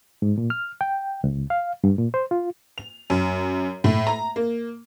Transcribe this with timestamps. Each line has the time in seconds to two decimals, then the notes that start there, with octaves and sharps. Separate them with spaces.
0.22 G#2
0.38 A#2
0.50 F6
0.81 G5
1.24 C#2
1.50 F5
1.84 G2
1.98 A#2
2.14 C5
2.31 F4
2.78 F7
3.10 F#2
3.84 A2
4.07 A#5
4.36 A#3